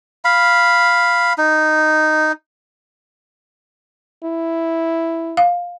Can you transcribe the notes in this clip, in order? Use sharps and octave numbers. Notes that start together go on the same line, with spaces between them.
F5 B5
D#4
E4
F5